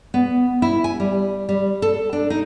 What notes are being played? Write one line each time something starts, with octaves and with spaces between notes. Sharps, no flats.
B3
E4
G#5
G3
G3
A4
D4
D#4